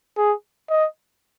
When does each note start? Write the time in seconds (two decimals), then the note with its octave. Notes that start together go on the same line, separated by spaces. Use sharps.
0.17 G#4
0.70 D#5